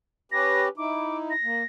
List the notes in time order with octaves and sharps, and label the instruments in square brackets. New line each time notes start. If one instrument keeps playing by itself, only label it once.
[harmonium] C#4 G4 B4 [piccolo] A#6
[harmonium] D#4 E4 [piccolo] D6
[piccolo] A#6
[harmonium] A#3